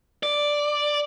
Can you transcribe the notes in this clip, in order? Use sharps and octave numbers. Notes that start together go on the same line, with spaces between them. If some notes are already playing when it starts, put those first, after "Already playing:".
D5